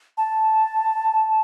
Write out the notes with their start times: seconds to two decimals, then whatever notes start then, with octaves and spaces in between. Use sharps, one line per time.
0.18 A5